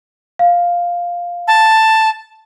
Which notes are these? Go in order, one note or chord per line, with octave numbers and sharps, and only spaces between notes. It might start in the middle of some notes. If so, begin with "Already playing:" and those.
F5
A5